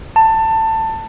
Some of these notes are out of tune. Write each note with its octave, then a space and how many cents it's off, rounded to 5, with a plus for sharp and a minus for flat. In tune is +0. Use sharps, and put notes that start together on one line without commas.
A5 +20